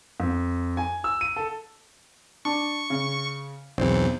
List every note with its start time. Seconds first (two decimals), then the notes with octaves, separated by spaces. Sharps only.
0.20 F2
0.77 G#5
1.04 E6
1.21 D#7
1.36 A4
2.45 D4 C#6
2.90 C#3
3.78 B1 E2 C4